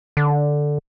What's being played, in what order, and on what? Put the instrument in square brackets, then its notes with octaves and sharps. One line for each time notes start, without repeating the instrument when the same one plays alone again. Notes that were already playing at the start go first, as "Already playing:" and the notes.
[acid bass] D3